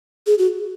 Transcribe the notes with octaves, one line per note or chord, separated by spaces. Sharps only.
G#4
F#4